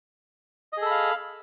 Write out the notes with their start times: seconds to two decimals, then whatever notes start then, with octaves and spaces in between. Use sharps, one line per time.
0.73 D#5
0.77 G#4
0.82 A4
0.86 B5
0.91 F5